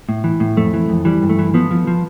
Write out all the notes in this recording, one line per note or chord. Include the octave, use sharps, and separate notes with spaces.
A2
E3
A2
F2 A3
E3
F2
E3 G3
G2
A3
E3
F3 B3
F3
F3